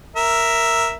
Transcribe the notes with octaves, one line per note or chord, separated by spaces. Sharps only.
A#4 E5